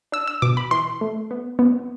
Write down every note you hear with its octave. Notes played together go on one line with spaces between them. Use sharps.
D4 E6
E6
B2 D6
B5
E3 C6
A3
B3
B3